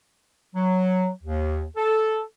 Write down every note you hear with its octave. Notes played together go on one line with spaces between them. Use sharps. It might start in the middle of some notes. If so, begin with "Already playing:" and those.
F#3
D#2
A4